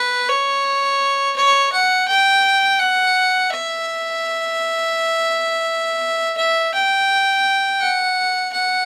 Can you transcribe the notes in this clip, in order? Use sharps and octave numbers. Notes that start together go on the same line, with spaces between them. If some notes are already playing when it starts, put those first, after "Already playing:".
Already playing: B4
C#5
C#5
F#5
G5
F#5
E5
E5
G5
F#5
F#5